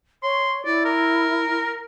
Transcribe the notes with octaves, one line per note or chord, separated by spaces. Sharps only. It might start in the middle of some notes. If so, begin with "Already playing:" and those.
C#5 C6
E4 D5
A#4